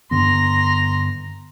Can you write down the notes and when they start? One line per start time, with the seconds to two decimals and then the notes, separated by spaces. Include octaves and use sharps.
0.11 G2 D3 B3 A#5 C6 A#6